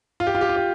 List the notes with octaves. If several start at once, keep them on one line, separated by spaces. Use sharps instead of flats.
F4
G4
F4
G4
F4
G4